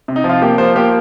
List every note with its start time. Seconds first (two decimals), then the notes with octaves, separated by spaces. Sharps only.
0.08 C3
0.16 D#4
0.24 F3
0.29 F4
0.42 A#3 G4
0.58 F3 C5
0.76 A#3 G4